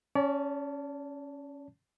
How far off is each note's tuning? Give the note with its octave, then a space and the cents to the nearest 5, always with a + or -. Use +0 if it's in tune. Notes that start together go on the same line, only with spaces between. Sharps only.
C#4 +5 D5 -40 A5 +0